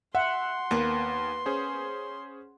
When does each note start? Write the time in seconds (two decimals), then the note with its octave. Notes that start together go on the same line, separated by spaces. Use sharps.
0.15 E5 F#5 C6
0.71 D#2 A#3 B3 B4
1.46 C#4 G#4 C5